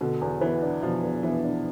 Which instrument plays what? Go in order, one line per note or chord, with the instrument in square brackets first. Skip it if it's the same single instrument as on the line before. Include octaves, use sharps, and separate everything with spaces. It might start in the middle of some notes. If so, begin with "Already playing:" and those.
[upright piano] B2 [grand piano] D3
[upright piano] E2
[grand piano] E3 [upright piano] B3
[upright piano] D4
[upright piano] B2 [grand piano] F3
[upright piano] E2
[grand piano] E3 [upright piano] B3
[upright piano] D4